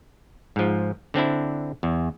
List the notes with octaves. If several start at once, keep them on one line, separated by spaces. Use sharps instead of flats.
G#2 F3
D3 C4 D4 E4
E2